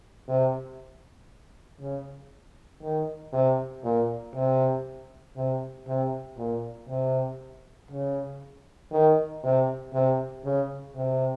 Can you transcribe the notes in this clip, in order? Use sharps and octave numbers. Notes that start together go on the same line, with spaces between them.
C3
C#3
D#3
C3
A#2
C3
C3
C3
A#2
C3
C#3
D#3
C3
C3
C#3
C3